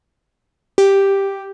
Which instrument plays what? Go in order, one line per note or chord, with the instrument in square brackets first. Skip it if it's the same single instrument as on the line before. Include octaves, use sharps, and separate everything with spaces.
[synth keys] G4